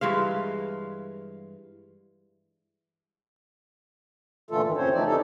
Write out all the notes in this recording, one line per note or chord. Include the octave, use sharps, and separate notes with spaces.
G2 E3 G#3 F5
A#2 D3 E3 A3 F4 A4
G2 D#3 E3
F2 C#3 C4 C#4 C5 C#5
E3 F3 A3 D#4 D5
C#3 E3 C4 D#4 G4 A4